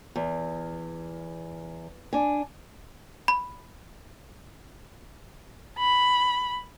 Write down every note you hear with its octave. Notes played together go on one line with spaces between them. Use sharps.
E2
D4 G#5
B5
B5